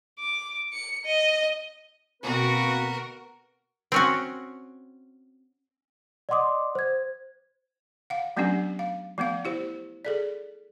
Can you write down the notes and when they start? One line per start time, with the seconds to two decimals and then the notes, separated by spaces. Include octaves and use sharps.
0.19 D6
0.73 C#7
1.06 D#5
2.23 D2 B2 A#3 C4 F#4 A#4 B4
3.92 C4 C#4 F#4
6.29 D5 D#5 F#5 C6 D6 D#6
6.75 C5 G#6
8.10 F5 F#5
8.37 F#3 A3 B3 C#4 D4 G4
8.79 F5
9.18 F3 A3 B3 F5
9.45 E4 G4 C5
10.05 G#4 A4 D5